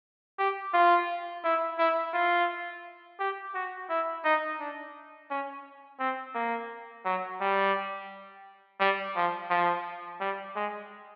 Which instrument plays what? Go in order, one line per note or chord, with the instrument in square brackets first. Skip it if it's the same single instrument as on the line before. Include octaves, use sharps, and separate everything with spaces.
[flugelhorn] G4
F4
E4
E4
F4
G4
F#4
E4
D#4
D4
C#4
C4
A#3
F#3
G3
G3
F3
F3
G3
G#3